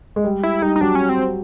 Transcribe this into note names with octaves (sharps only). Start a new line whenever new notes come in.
G#3
G3
E4
G3 D#4
D#4
F#3 D4
C#4
C4